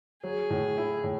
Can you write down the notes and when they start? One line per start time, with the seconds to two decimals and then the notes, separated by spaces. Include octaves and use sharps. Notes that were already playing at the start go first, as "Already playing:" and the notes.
0.23 F#3 G#4
0.50 A2
0.77 E4
1.04 A2